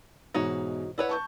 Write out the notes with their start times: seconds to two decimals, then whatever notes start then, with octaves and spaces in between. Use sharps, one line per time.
0.34 G#2 B2 E3 D#4 F#4 C#5
0.98 E4 B4 C#5 D5 F#5
1.09 A5 C#6 G6